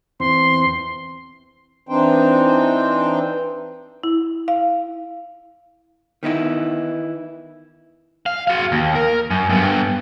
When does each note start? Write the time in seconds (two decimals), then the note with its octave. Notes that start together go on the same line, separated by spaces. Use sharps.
0.20 E2 C4 C6
1.89 E3 C4 D4 D#4 C5 G5
4.03 E4
4.48 F5
6.23 D#3 B3 D#4 E4
8.26 F5
8.47 F#4 F5
8.72 D#2
8.95 A#4
9.30 F#2
9.49 G2 B3